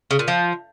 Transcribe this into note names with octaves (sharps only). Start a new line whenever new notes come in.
C#3
A#2
F3